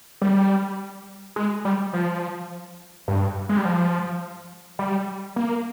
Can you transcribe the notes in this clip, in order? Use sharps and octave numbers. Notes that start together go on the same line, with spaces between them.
G3
G#3
G3
F3
G2
G#3
G3
F3
G3
A#3